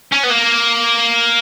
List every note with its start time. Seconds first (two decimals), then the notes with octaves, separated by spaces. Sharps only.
0.13 C#4
0.24 B3
0.30 A#3